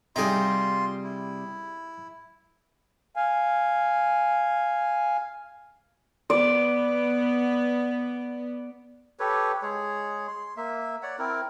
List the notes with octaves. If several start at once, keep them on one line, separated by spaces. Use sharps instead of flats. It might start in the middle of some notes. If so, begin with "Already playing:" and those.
C3 G3 D#4 F4 G#4 C6
E4
F5 G#5
B3 D5
G4 A4 B4 C#5
G#3 G#4 C#5
C6
A#3 E5
C#5 D5 F#5
C4 E4 A#4